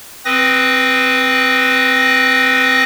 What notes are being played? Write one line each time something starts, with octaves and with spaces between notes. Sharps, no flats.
C4 B4 D#6 A#6